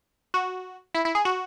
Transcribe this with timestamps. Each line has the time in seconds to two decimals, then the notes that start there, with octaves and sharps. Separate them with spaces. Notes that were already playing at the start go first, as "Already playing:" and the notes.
0.34 F#4
0.95 E4
1.05 E4
1.15 G#4
1.25 F#4